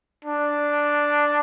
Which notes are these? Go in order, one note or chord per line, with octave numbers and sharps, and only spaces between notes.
D4